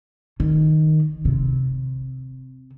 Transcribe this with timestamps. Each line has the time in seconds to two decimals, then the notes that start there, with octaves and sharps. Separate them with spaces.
0.40 D#3
1.25 C3